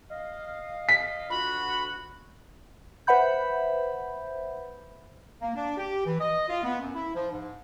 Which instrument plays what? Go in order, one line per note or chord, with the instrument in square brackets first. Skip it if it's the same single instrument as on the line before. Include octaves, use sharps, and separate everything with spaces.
[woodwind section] D#5 F5
[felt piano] B6
[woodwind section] D2 F4 F#4 [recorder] B5
[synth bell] B4 C5 E5 F#5 B5 G6
[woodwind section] A#3
D4
G4
E3
D#5
F4
B3
F#2
E4
F3
G#2